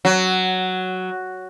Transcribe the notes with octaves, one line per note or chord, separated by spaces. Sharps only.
F#3